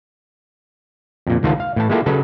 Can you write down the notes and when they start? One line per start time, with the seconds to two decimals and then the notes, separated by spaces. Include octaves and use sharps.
1.27 F2 A#2
1.43 C#2 D#3 F4 C5 F#5 A5
1.60 F5
1.76 A2 E3 A5
1.90 G#3 A#3 E4 F4 G4 A4
2.06 C#3 F#3 A4 B4